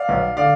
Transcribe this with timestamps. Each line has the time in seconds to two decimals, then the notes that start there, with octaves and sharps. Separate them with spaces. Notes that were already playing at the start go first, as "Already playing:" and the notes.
Already playing: D5 F5
0.09 B1 B2
0.37 D3 D5 F5